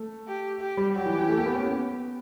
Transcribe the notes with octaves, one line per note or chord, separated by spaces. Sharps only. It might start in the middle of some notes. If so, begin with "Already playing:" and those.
Already playing: A3
G4
G4
G3
F#3 G4
E3
E3
A3
A#3
B3
C#4
B3